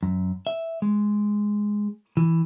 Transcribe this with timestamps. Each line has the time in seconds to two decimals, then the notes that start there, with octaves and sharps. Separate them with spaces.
0.03 F#2
0.47 E5
0.82 G#3
2.17 E3